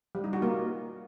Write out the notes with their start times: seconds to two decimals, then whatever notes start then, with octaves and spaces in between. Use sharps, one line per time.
0.15 G3
0.24 D#4
0.33 F#4
0.42 A#3